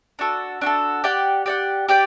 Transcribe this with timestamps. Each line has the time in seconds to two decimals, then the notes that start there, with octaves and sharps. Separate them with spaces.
0.19 D4 F#4 A4
0.61 D4 F#4 A4
1.04 G4 D5 F#5
1.46 G4 D5 F#5
1.89 G4 D5 G5